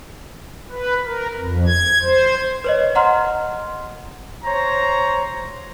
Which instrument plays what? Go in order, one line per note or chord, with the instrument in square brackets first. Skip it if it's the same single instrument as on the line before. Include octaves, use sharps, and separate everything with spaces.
[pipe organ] B4
A#4
F2
G#6
C5
[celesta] B4 C#5 D#5
D#5 F#5 A#5 C6 F6
[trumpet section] C5 C#5 A#5